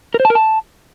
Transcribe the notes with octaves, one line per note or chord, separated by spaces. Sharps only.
A#4
C5
A5
A#4
A5